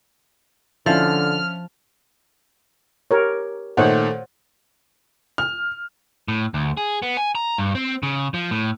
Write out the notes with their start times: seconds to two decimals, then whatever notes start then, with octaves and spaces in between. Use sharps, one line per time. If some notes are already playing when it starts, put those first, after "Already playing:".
0.86 D3 F3 C#4 D4 E4 F6
3.11 G4 A#4 C#5
3.77 A#2 D#3 A3 C5 C#5 F#5
5.38 F6
6.28 A2
6.54 D2
6.77 G#4
7.02 B3
7.17 G#5
7.35 A#5
7.58 G2
7.75 C4
8.03 C#3
8.34 F3
8.51 A2